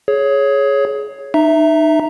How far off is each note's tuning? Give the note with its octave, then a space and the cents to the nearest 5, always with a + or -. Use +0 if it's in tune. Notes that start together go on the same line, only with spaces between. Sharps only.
G#4 +20 C#5 +0
D#4 -30 E5 -5 A#5 +0